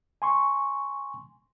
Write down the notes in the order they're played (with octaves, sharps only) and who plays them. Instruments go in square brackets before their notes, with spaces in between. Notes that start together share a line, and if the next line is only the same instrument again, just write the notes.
[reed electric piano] G#5 C6 C#6